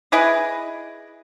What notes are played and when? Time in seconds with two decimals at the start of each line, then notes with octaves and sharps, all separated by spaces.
0.12 E4 G#4 B4 D#5